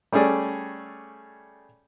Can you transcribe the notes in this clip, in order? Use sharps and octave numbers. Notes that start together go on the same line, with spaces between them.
G3 A3 C#4 G#4 D5